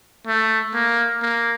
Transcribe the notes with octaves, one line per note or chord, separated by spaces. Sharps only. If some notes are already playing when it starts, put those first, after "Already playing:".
A3
A#3
A#3